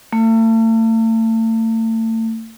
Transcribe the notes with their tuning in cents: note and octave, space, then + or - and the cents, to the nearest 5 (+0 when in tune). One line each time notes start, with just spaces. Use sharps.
A3 +40